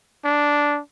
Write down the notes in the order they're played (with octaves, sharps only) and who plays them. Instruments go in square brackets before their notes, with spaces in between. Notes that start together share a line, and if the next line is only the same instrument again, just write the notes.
[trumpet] D4